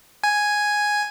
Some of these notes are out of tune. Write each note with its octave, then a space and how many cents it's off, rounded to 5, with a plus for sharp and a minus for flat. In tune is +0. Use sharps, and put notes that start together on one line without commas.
G#5 +0